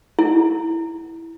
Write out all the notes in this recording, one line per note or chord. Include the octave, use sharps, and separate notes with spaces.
E4